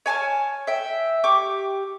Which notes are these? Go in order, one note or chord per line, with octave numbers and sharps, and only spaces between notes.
C#5 G#5 A5 F6
E5 G5
G4 C#6 D6